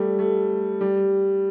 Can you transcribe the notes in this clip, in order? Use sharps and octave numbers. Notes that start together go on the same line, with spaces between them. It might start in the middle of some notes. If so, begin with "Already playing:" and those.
Already playing: G3 A3
A3
G3